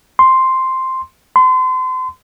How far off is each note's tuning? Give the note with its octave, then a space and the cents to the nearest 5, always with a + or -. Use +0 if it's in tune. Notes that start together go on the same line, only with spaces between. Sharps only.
C6 +0
C6 -35